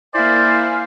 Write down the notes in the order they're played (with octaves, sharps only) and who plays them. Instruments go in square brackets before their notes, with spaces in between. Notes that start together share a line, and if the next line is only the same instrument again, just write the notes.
[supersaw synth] A#3 E4 [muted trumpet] C5 [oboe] D5 [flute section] E5 F5 G#5